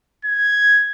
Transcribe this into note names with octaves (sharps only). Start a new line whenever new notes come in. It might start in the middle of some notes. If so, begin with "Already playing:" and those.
G#6